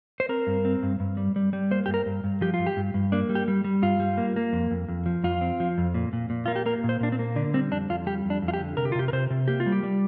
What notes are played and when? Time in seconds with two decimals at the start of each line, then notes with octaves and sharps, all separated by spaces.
0.20 C5
0.29 C4 A#4
0.47 G2
0.65 C4
0.83 G2
1.00 G2
1.17 G3
1.36 G3
1.53 G3
1.71 A#3 C5
1.86 G2 G4
1.94 A#4
2.06 G2
2.24 G2
2.41 F3 G4
2.54 F4
2.59 G2
2.67 G4
2.77 G2
2.94 G2
3.12 A#3 D4
3.29 G3
3.35 G4
3.48 G3
3.64 G3
3.82 G2 F4
4.00 G3
4.18 A#3
4.36 A#3
4.53 F2
4.71 F2
4.88 F2
5.06 F3
5.24 F2 F4
5.41 C4
5.60 F3
5.78 F2
5.94 A#2
6.13 A#2
6.30 A#2
6.46 A#3 F4
6.56 G4
6.66 A#3 A#4
6.84 A#2
6.89 C5
7.00 A#2 D4
7.12 C4
7.19 A#3
7.36 D3 D4
7.54 G3 C4
7.71 F2 D4
7.90 F2 F4
8.06 G3 G4
8.25 F2
8.30 D4
8.42 F2
8.48 F4
8.54 G4
8.59 D3
8.77 C3 A#4
8.85 G4
8.92 F4
8.95 C3 G4
9.08 A#4
9.13 C3 C5
9.30 C3
9.48 A#3 G4
9.60 F4
9.66 G3
9.72 G4
9.83 G3